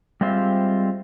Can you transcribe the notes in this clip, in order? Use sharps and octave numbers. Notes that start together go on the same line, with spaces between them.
G3 G#3 C4 F4 E5